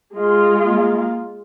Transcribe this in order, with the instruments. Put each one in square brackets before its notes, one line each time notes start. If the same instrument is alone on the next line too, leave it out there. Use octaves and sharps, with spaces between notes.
[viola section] G#3 F4
[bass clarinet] A#3